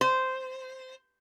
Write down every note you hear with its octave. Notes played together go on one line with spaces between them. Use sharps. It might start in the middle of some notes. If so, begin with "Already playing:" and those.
C5